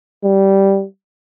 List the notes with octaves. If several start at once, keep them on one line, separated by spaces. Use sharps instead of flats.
G3